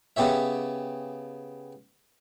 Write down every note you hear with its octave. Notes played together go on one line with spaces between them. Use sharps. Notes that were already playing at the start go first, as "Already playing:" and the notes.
C#3 B3 G4 C#5 E5